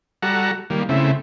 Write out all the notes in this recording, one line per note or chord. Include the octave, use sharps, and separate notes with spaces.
G3 F#4 A4 F#5 A#5
D#3 G3 A#3
C#3 A3 C4 E4